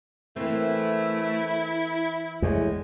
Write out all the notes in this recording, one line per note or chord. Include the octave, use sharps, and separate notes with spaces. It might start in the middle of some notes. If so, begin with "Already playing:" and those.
E3 A3 A#3 C4 E4
E2 A2 G#3